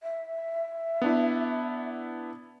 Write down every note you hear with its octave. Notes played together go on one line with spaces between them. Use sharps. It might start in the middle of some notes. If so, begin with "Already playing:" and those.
E5
B3 D4 E4